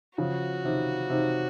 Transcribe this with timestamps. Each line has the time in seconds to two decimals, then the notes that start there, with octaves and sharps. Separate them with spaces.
0.18 C#3 F3 F#4
0.64 C3 D#3
1.10 C3 D#3